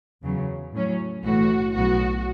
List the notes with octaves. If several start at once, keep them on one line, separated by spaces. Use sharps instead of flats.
E2 C#3 F#3
A2 F#3 C#4
B1 A2 E3 A3 F#4
B1 A2 F#3 B3 F#4